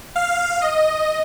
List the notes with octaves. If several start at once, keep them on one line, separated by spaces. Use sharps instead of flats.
F5
D#5